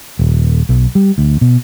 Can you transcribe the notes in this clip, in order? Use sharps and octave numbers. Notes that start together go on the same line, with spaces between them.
D#1
B1
G3
D2
B2